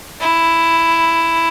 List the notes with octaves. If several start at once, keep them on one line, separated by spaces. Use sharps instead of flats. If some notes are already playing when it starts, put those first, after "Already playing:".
E4